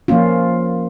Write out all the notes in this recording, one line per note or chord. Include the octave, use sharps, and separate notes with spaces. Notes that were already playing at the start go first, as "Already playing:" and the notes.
F3 A#3 C#4 F4